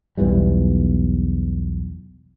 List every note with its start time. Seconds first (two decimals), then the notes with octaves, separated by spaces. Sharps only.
0.17 B1 E2 E3 G3